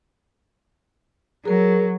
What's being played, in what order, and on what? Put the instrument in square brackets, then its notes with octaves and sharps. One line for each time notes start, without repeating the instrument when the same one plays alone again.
[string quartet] F#3 [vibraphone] G#4 A#4